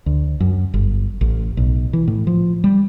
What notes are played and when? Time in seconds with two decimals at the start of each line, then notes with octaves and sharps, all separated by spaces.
0.06 D2
0.40 F#2
0.74 G1
1.21 A1
1.57 B1
1.93 E3
2.08 A2
2.27 F3
2.64 G3